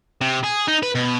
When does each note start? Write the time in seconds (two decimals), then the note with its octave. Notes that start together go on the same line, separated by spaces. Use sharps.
0.21 C3
0.44 G#4
0.68 D#4
0.83 B4
0.95 B2